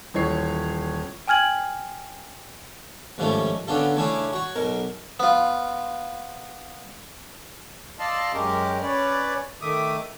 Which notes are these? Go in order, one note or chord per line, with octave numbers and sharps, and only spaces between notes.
D#1 E3 C#5 C7
G5 G#5 F6 G#6 F#7
D#2 G#2 F3 G3 A3 C#4
D3 B3 C#4 D4 F4 A4
C#3 A3 C#4 D4 E4 G#4
F#4 C#5
B1 B2 A#4
B3 F4
D5 D#5 F5 A5 C6 E6
F#2 G#3 C#4 G4 A#4
C#4 B4 C#5 D5
D#3 A3 E5 D6 D#6